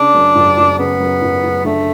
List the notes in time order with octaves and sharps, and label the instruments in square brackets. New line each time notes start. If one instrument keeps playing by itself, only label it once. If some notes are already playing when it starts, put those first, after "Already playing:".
Already playing: [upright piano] C#3 [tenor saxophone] D4
[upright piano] F#2
F#1
F#1
[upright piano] C#3 [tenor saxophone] B3
[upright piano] F#2
F#1
F#1
[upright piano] D3 [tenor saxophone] A3